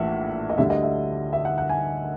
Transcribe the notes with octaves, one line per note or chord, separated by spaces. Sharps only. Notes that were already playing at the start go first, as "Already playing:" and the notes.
Already playing: A#1 A2 E3 E5 F#5
D#5
D2 D3 G3 E5
D#5
E5
E5
F#5
F#5
G#5